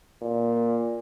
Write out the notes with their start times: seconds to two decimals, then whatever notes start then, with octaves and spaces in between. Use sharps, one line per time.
0.22 A#2